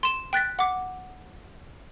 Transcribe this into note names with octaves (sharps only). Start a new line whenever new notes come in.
C6 E7
G5 F#6 A6 B6
F#5 D6